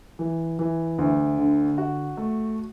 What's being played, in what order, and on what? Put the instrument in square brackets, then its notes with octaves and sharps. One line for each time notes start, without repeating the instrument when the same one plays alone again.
[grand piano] E3
E3
D2
D3
F#4
A3